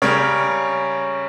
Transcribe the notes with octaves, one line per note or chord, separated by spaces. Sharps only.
C#3 G3 C#4 A#4 C#5